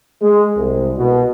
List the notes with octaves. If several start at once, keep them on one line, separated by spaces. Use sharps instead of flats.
G#3
C2
B2